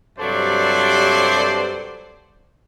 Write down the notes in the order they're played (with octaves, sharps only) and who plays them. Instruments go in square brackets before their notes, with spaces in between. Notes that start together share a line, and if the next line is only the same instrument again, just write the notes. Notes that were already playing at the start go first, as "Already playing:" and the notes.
[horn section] G2 C3 F#3 A4 C5 D5